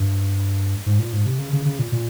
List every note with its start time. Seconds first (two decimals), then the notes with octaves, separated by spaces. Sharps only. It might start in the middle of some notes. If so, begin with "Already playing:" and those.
Already playing: G2
0.86 G#2
0.99 A#2
1.13 G#2
1.26 C3
1.39 C#3
1.53 C#3
1.65 C#3
1.79 A#2
1.92 A#2